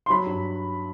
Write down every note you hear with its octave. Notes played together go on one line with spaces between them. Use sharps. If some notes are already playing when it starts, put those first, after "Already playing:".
C6
F#3 B5
G2